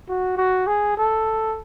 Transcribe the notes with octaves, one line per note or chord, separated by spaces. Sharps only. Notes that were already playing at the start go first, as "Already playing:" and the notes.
F#4
F#4
G#4
A4